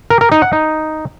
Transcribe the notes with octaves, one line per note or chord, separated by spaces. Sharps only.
A#4
A#4
D#4
F#5
D#4